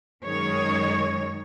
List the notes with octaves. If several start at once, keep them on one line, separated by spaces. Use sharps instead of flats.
F#2 D#3 G#3 C#5